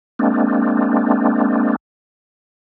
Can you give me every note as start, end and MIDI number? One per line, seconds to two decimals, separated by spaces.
0.19 1.76 56
0.19 1.76 58
0.19 1.76 60
0.19 1.76 62